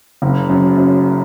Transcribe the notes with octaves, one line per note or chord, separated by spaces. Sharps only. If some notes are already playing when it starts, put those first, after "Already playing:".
F#1
F#2
F#2